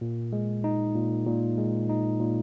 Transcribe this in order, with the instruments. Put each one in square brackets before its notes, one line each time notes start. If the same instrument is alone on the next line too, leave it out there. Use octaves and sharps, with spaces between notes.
[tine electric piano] A#2
G#3
D#4
A#2
A#2
G#3
D#4
A#2